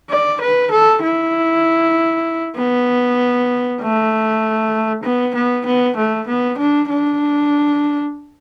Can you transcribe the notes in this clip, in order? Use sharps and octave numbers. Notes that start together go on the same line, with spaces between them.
D5
B4
A4
E4
B3
A3
B3
B3
B3
A3
B3
D4
D4